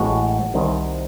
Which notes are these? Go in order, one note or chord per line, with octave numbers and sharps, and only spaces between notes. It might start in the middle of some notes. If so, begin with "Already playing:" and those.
Already playing: A1 A2 G#3 F#4
C2 C3 D#3